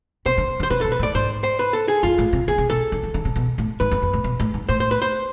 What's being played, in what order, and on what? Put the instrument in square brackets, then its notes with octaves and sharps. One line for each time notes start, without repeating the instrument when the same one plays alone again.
[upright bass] C3 [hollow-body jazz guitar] C5
[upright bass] D3
D3
[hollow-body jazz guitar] C5
[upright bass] C3 [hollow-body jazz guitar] B4
[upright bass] B2 [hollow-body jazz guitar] A4
[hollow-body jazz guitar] B4
[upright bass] A2
[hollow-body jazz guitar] D5
[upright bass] G#2 [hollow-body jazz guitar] C5
[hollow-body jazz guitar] C5
B4
A4
G#4
[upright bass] F2 [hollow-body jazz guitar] F4
[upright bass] A2
C3
[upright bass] D3 [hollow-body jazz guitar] G#4
[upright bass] C3
[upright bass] B2 [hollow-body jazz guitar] A4
[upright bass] D3
E3
D3
C3
B2
A2
[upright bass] G#2 [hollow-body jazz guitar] B4
[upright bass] F2
F2
A2
B2
A2
G#2
[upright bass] A2 [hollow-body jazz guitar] C5
[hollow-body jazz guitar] C5
B4
C5